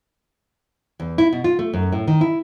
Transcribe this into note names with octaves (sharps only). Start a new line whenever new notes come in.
E2
E4
B2
F4
A3
F#2
A2
D#3
E4